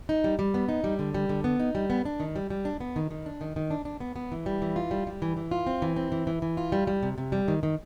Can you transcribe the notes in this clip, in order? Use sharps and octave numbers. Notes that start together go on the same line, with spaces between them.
D#4
G3
G3
B3
D#4
G3
D3
G3
D3
B3
D#4
G3
B3
D4
D#3
G3
G3
D4
B3
D#3
D#3
D4
D#3
D#3
D4
D4
B3
B3
E3
G3
E3
F4
G3
G3
E3
E3
F4
C4
E3
C4
E3
E3
E3
F4
G3
G3
C3
C3
G3
D#3
D#3